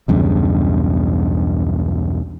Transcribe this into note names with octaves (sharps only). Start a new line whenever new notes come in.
B1 E2 G2 C#3